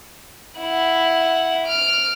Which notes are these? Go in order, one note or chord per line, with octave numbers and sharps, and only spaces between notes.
E4 F#5
F6 D7